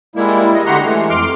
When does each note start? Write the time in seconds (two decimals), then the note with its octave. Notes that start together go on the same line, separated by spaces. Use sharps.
0.16 G3 G#3 A#3 E4
0.54 G#3 D#5
0.66 D3 F#4 G4 F#5 A#5 C6
0.84 E3 G#3 A3
1.10 F2 C6 D6 F6